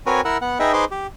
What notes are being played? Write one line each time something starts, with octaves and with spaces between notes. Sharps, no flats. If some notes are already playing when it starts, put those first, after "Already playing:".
C4 F#4 A#4 B4 C#5 G#5
E4 A#4 F#5 E6
B3 F#5
D#4 G#4 B4 D#5 E5 G5
D#4 G#4 B4 C5 C6 D6
G4